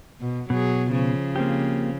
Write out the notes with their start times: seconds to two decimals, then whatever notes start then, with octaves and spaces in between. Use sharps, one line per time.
0.21 B2
0.50 B2 F#3 G#4
0.92 C#3 F3
1.36 A#3 C4 G4